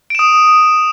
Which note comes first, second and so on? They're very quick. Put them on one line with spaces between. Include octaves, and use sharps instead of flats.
D7 E7 D#6